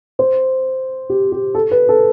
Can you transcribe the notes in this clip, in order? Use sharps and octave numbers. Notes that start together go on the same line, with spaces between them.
C5
G4
G4
A4
B4
A4